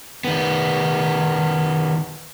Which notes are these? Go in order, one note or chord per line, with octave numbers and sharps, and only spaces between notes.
D#3 B3